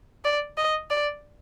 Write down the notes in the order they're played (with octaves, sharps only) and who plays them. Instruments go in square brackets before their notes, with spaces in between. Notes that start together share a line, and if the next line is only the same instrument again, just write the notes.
[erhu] D5
D#5
D5